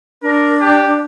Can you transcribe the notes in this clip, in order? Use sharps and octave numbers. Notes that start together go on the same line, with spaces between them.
D4 A#4
G4